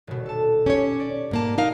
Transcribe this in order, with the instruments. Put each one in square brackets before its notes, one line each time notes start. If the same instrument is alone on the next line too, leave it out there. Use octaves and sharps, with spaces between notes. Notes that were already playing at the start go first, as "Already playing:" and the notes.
[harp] D#1 B2
A4 A5
[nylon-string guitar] C#4 C#5 [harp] G4
[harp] D5
[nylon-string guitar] G#2 A#3 A5
D#4 A#4 F5